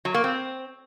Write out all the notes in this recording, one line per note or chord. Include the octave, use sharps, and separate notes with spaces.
F#3
A#3
C4